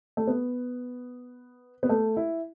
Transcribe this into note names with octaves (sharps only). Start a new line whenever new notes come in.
A3
B3
B3
A3
E4